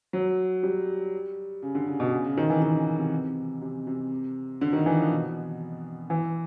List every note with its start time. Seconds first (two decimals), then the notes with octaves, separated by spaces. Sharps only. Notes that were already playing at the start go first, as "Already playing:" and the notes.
0.13 F#3
0.63 G3
1.63 C#3
1.75 D3
1.87 C#3
2.00 B2
2.13 C#3
2.24 C#3
2.37 D#3
2.50 E3
2.62 D#3
2.74 C#3
2.99 C3
3.62 C3
3.87 C3
4.61 D3
4.73 D#3
4.86 E3
4.98 F3
5.10 B2
6.10 E3